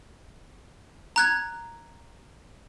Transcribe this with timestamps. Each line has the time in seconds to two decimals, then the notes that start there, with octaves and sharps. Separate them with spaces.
1.16 A#5 F#6 G#6